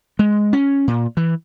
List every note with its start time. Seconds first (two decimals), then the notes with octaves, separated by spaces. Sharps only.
0.19 G#3
0.53 C#4
0.88 A#2
1.17 E3